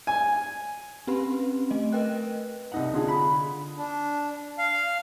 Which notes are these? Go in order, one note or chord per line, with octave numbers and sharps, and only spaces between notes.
G#5
C4 C#4 G4 B4 B5 C6
A3 D#5
A#4 B4 D#5 G5 F#6
C2 D#4 F#5
D3 F4 G#4
B5
D4
F5